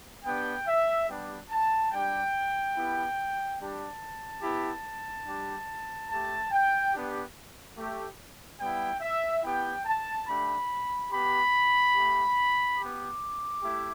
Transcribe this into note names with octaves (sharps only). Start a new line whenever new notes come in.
B3 D4 G4 G5
E5
G3 B3 D4 G4
A5
G3 D4 G4 G5
B3 E4 G4
G3 D4 G4 A5
B3 E4 G4
G3 D4 G4
A3 G4 A5
G5
B3 D4 G4
A3 G4
G3 B3 E4 G5
E5
B3 E4 G4 G5
A5
A3 D4 G4 B5
B3 G4 B5
A3 G4
B3 G4 D6
A3 E4 G4